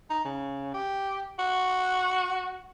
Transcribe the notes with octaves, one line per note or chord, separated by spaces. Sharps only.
D#4
C#3
G4
F#4